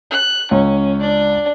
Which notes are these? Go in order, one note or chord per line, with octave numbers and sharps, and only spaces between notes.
F#6
C#2 C#4
D4 D5